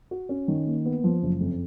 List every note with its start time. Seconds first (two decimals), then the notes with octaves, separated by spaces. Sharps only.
0.11 F#4
0.29 C#4
0.48 D#3
0.67 A#3
0.85 B3
1.04 F3
1.23 F#1
1.41 F2